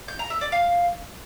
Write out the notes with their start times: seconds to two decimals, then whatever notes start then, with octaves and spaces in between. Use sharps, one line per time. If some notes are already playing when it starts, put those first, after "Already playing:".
0.08 G6
0.19 A#5
0.30 E5
0.41 D5
0.52 F5